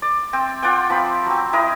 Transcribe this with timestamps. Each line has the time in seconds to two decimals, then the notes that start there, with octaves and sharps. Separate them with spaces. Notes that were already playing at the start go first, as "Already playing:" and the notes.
0.02 D5
0.33 C4 G5
0.62 F4 D5 F#5 G5
0.90 F3 C4 B5
1.26 F#3 C4
1.53 E4 A#4 D#5